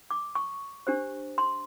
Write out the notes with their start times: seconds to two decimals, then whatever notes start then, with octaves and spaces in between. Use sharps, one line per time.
0.10 D6
0.35 C#6
0.87 D4 G4 C5
1.38 C6